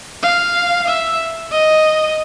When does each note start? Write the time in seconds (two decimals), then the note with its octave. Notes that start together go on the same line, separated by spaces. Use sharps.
0.23 F5
0.88 E5
1.52 D#5